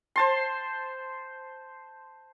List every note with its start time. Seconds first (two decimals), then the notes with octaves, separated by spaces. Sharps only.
0.16 C5 A5 C6